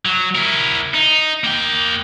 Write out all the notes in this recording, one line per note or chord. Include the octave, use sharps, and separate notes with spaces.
F#3
E4 A#4
D#4
A#3 G5